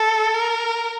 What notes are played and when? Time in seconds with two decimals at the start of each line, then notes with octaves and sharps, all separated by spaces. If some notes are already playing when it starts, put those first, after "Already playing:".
Already playing: A4
0.34 A#4